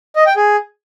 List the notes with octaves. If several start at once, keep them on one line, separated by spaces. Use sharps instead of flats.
D#5
G5
G#4